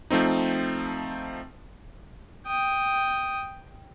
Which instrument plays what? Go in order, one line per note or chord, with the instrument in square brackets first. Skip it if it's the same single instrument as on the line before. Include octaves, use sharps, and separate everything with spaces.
[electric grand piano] F3 A3 C4 D#4
[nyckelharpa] G5 D#6